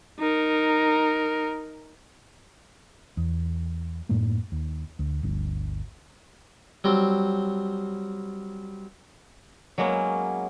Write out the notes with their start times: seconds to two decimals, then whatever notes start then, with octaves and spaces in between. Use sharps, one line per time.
0.19 D#4 A#4
3.17 E2
4.09 F#2 A2 F#3 A#3
4.52 D#2
4.99 D2
5.23 G1 D2
6.84 F#3 G3 C4
9.78 F#3 G#3 A#3 B3 C#4